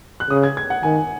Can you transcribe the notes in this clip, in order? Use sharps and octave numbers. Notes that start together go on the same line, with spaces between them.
F#6
C#3 D#6
G#6
G#6
F#5
D#3 G#5